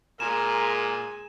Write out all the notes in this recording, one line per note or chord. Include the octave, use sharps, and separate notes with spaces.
A#2 G#3 A#4 G#5 E7